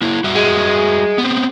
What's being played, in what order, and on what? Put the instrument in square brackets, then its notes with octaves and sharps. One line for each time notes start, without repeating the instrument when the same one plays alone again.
[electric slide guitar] A#3 E4
G3 F#4 E5
[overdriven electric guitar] G#3
[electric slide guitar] B3 C4